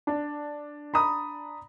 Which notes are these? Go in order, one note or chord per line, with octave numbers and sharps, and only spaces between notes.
D4
A#5 B5 D#6